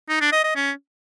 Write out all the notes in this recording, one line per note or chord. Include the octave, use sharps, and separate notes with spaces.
D#4
D4
D#5
D#5
C#4